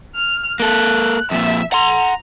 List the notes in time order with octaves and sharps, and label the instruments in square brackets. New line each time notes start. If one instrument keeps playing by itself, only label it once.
[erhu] F6
[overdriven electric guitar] A#3 A4 [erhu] F#6
[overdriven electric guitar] F2 A#2 [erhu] E5
[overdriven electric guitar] F#5 C6 [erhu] A#5